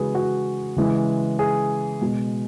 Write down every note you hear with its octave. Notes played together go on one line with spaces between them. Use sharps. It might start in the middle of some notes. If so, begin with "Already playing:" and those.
Already playing: C#3 E3 G#3 F#4 G#4 B4
F#4
C#3 E3 G#3
G#4
B2 G#3